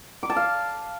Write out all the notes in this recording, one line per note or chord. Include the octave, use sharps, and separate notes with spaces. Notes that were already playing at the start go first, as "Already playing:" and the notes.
D6
A5
F5